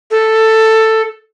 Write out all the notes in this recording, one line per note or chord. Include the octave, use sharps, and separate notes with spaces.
A4